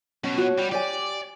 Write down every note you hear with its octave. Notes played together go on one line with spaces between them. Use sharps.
B2 C#4
F#4 C#5
G3
G4 C#5 D5 G#5